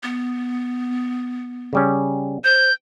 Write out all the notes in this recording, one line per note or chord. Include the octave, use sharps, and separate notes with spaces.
B3
C#3 G3 C#4
C5 G6